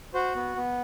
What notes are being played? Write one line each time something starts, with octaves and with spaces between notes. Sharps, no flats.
F#4 C5
B3
B3